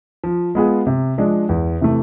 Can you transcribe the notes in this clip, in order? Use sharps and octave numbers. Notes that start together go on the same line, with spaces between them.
F3
G#3 B3 F4 G#4
C3
F3 G#3 D4
E2
C3 E3 A3